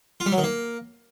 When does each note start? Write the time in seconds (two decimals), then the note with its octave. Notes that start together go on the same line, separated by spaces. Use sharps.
0.20 F4
0.26 G3
0.32 F#3
0.38 D#3
0.44 A#3